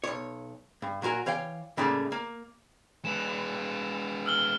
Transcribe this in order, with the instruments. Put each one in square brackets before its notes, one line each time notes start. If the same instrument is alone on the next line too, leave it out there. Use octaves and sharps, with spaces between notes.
[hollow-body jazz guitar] B1 C#5
G2
A#2 F#3 F#4 A#4 G#5
E3 C#5 F5 G5
A2 C#3 G3 A3 A#3
A#3
[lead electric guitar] G#3 B3 [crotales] E7 F7
[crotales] E6 F6 G7